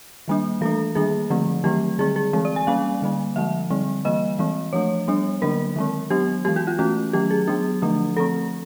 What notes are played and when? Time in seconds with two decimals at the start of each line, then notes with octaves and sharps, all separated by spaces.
0.28 D#3 G3 A#3 D4
0.61 E3 A3 D4 A4
0.95 D#3 G3 A#3 D4 G#4
1.30 D3 F3 A3 C4
1.64 D#3 F#3 A3 C4 G4
1.99 D3 G3 C4 G#4
2.16 G#4
2.33 E3 G#3 C4
2.45 D5
2.56 G#5
2.67 G3 A#3 C#4 F5
3.02 D3 G3 A#3
3.36 D3 F3 G#3 E5
3.70 D3 G3 C4
4.05 E3 G3 A#3 D#5
4.39 E3 G#3 C4
4.73 F3 A3 D4 C#5
5.08 G3 B3 D4
5.42 D3 F#3 A#3 D4 A#4
5.76 D#3 G#3 C4
6.10 F#3 B3 D4 G4
6.45 E3 G#3 B3 G4
6.56 F#4
6.67 F4
6.79 E3 A3 C#4 F#4
7.13 D#3 F#3 A3 C#4 G4
7.31 G#4
7.48 F#3 B3 D4 G#4
7.82 D3 F3 A3 D4
8.16 F3 A3 C4 A4